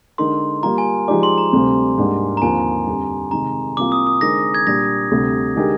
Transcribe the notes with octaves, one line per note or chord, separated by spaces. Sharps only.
D3 G#3 D#4 A#4 C6
G3 A#3 F4 A#5
G#5
F3 G#3 D#4 G4 D5 D6
C6
A#5
D2 C3 G3 C4
G#2 G3 A#3 D4
A#5
D#2 D3 F3 C4 F4 G#5
F2 D3 G3
C3 D#3 G#3 D#4 A#5
C2 C3 G3 A#3 F4 D6
D#6
D#6
D3 G#3 C4 D#4 A#4 A#6
G#6
A#2 G3 D4 A#6
D2 C3 G3
D3 G#3 D#4 G4 A#4